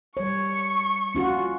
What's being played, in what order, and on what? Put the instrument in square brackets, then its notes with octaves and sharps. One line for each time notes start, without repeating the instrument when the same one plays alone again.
[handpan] G3 C#5 [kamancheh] C#6
[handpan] C#4 F4 F#4